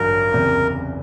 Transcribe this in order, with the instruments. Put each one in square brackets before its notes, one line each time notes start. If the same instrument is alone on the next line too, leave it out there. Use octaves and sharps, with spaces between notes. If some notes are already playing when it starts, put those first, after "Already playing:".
Already playing: [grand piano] A1 G2 D3 F#3 [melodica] A#4
[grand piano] F#1 E2 C3